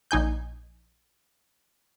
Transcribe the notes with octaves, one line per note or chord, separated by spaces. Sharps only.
A#1 D#4 G#5 G6